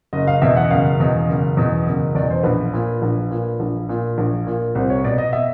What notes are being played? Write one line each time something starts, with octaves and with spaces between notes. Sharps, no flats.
F#1 D#5
F5
E2 B2 E5
F#5
F#1 F5
E2 B2
F#1
E2 B2
F#1
E2 B2 D5
C5
A#1 B4
A#2
A#1
A#2
A#1
A#2
A#1
A#2
C2 C5
C#5
B2 D5
D#5
E5